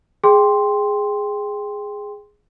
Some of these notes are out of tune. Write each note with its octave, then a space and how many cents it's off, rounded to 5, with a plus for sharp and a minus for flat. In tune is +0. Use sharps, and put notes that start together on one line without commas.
G#4 +0 G5 +10 C6 +0